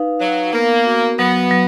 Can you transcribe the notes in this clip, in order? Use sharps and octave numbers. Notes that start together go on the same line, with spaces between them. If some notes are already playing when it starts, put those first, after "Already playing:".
Already playing: D#4 B4 F5
F#3 F5
A#3 B3
F#4
F#3 B3
F#3